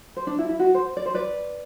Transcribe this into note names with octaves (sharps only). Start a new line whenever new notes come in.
C5
D4
E4
E4
F#4
C5
D5
C5
B4 D5